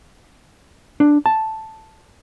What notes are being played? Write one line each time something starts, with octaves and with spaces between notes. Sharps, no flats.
D4
A5